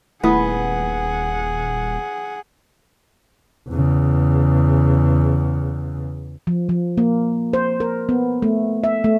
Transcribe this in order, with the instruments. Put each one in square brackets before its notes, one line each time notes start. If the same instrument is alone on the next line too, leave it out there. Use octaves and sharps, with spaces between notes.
[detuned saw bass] D#1 [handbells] A3 E4 D#6 [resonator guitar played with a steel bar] B3 [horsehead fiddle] G#4 F#5
[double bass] E2 C#3
[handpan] F3
F3
A#3
C5
A#4
B3
A3
E5
A3